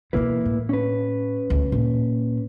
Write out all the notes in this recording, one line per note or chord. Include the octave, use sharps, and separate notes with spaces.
B2 E3 A#3 E4 B4
A2
C#4 B4
D2
A#2